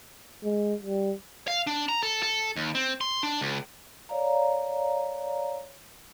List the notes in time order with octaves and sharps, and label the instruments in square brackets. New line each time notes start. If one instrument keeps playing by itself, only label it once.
[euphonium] G#3
G3
[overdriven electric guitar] F5
D4
A#5
A4
A4
D#2
C4
C6
D4
C#2
[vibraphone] C#5 D5 F5 A#5